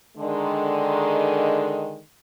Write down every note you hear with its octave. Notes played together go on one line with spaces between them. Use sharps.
D3 D#3 G#3